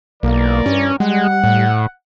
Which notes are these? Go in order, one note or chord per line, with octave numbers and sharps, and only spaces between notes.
B1 E3 A#3 A#4 D5
G2 C#4
G3 G#3 F#5
A2